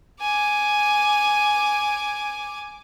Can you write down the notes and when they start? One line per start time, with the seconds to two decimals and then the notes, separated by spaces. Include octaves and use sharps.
0.21 G#5 D6